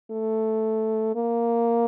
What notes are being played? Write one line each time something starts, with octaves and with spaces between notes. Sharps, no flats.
A3
A#3